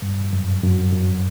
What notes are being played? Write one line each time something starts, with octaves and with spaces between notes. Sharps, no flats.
G2
F#2
F#2
F#2